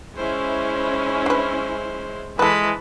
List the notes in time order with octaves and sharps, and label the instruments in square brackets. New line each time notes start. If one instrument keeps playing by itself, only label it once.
[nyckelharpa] G#3 C5 [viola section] C#4 E4
[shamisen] D4 B4
[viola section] E3 [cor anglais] G#3 [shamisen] A4 B4 [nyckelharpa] A5 B5